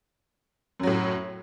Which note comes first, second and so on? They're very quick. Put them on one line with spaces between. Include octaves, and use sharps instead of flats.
F#2 F#3 A2